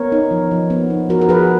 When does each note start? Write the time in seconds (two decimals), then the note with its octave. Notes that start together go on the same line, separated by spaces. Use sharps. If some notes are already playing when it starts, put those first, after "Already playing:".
Already playing: B3 A#4 C#5
0.12 D#4
0.31 F3
0.51 F3
0.70 B3
0.90 D#4
1.09 F3 F#4 A#4
1.21 A#4
1.29 F3 G#4 B4